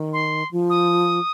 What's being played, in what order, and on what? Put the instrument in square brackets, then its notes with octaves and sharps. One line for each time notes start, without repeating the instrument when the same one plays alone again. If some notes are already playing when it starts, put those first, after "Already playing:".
Already playing: [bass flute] D#3
[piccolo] C6
[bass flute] F3
[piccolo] D#6